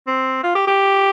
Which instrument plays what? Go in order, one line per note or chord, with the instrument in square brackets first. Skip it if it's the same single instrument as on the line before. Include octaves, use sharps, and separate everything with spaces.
[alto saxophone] C4
F4
G4
G4